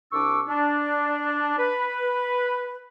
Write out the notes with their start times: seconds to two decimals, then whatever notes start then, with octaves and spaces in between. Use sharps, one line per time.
0.12 C2 D4 C#6 D6 E6
0.48 D4
1.58 B4